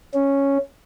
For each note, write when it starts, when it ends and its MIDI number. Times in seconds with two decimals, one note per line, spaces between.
0.14 0.58 61